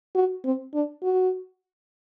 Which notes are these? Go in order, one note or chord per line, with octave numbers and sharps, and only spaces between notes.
F#4
C4
D4
F#4